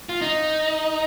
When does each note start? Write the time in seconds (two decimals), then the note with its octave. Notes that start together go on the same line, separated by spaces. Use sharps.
0.09 F4
0.22 D#4